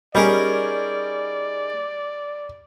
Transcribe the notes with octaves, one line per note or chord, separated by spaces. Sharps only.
G3 C#4 D#4 G#4 A#4 D5